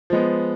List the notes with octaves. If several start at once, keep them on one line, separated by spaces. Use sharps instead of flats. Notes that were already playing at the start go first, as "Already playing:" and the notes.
F3 G#3 B3